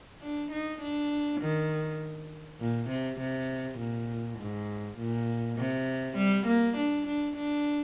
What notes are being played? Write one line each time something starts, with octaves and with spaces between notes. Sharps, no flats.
D4
D#4
D4
D#3
A#2
C3
C3
A#2
G#2
A#2
C3
G3
A#3
D4
D4
D4